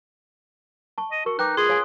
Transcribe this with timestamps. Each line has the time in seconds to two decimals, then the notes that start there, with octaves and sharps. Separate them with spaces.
0.98 A5 C#6
1.12 D#5
1.26 F#4 A#4 C#6
1.39 D#4 B4 G5 D6 F#6
1.57 F4 G#4 C6 D#6
1.69 C#5 F5 G#5